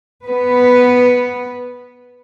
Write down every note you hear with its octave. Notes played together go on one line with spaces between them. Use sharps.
B3 B4